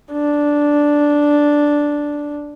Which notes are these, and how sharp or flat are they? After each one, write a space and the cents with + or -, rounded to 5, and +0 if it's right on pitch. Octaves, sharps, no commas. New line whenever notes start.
D4 -5